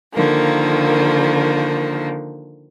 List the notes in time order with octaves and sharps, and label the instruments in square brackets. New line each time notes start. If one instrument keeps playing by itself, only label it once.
[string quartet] D3 D#3 F3 A#3